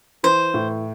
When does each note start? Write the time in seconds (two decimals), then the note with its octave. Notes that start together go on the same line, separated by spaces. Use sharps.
0.23 E3 C5
0.54 A2